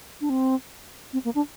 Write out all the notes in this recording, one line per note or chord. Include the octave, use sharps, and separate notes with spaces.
D4
C4
C4
A#3
D4